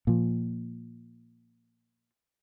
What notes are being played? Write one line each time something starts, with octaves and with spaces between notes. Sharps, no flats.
A#2 F3